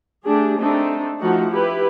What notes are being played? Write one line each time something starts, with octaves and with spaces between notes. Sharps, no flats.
A3 D4 G4 G#4
A3 C4 D4 D#4
F3 A3 D#4 F#4 F#5
E4 G4 B4